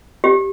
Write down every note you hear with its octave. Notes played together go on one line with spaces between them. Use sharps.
G4